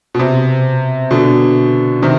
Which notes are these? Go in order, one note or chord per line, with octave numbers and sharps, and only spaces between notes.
B2
C3
B2 D3
C3 D#3